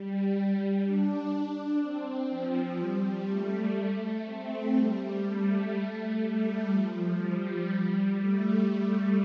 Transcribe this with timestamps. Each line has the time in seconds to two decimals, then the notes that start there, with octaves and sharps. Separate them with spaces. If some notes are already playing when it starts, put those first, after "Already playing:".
Already playing: G3
0.82 D4
1.79 C4
2.29 F3
2.78 G3
3.26 A3
4.25 C4
4.74 G3
5.22 A3
5.71 A3
6.21 G3
6.69 F3
7.18 G3
7.66 G3
8.15 A3